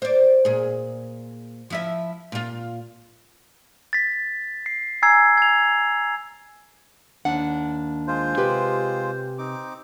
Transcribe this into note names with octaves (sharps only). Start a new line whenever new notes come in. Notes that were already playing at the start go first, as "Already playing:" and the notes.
C5 D5
A#2 G#4
F3 E4 E5
A#2 F4
A6 B6
C7
G#5 A#5 E6 G#6 C7
G#6 F7
D#2 D4 F#5
G#3 F4 C5
C3 G4 B4
C4 D#4 D6